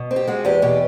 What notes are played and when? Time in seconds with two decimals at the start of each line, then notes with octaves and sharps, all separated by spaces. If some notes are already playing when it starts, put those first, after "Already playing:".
Already playing: B2
0.11 C4
0.16 G4
0.27 G#3 F#4
0.45 E2 G4
0.62 B2 G4